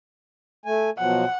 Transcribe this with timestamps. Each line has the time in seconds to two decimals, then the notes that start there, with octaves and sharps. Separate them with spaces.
0.66 A3 G#5
0.98 B2 F3 F#3 F#5